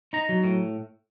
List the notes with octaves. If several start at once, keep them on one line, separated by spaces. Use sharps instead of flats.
D#4 A#5
F#3
A2